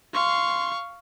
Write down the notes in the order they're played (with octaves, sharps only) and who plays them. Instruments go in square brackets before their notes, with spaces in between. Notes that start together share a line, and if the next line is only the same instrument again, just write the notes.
[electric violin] F5 C#6 [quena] C6